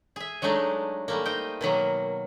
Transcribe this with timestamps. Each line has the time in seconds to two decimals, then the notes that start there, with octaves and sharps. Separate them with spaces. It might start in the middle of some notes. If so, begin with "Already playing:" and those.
0.16 G#4 E5
0.42 F#3 G#3 A3 D4 D#4
1.08 G3 A3 A#3
1.25 D#4 C5 G5
1.61 B2 D#3 F#3 A#3